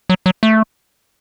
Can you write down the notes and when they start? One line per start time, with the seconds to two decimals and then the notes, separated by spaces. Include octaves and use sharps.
0.10 F#3
0.26 F#3
0.43 A3